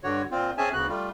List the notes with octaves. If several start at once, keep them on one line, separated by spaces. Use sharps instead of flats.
G2 D3 F#4 C#5
A#2 C4 F4
C4 C#4 G#4 E5 G#5 A5
D2 C#3 B3 F#4 F#6
G3 A3 F4